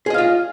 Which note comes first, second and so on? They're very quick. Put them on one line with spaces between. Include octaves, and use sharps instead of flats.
G#4 D#5 F5 F4